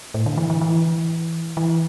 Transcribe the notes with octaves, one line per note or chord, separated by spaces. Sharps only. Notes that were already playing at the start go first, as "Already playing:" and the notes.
A2
D3
E3
E3
E3
E3